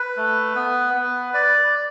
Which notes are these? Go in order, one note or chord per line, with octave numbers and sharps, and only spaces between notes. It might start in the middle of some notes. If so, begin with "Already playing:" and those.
Already playing: B4
A3
B3
B3
D5